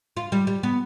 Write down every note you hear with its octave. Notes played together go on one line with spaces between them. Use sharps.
F4
G3
G3
B3